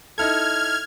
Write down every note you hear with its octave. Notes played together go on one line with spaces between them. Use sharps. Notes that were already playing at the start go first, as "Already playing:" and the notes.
D#4 E4 A4 F6 G#6